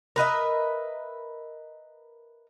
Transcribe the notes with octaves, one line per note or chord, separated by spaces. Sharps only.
A#4 B4 D#5 E5